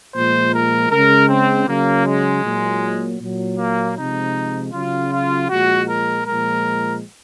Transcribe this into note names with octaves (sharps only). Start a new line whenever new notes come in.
A#2 F3 G#3 C5
A#4
C#3 G#3 A#4
C4
C#3 F#3 A#3
G#3
A#2 F#3
A#2 F#3
A#3
C3 F3 G#3 D#4
C#3 F#3 F4
F4
A#2 F3 G#3 F#4
A#4
A#2 F3 G#3 A#4